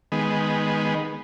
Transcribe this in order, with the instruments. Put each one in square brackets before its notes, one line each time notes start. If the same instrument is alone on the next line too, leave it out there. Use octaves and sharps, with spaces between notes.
[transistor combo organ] D#3 G#3 B3